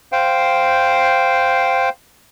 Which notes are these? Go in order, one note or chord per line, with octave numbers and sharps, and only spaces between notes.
C5 F5 G5